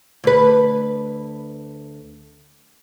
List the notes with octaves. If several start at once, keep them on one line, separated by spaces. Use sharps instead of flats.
D2 B4